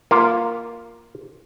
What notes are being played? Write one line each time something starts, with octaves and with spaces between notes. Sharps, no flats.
A#3 F4